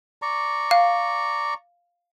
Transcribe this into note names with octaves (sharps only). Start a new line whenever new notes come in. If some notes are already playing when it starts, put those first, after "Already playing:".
D5 A#5 C#6
F5